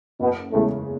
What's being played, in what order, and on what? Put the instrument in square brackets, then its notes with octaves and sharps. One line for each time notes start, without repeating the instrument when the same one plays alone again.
[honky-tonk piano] F#1 [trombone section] B2 B3
[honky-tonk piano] E2 C#3 G#3 [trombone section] A2 A3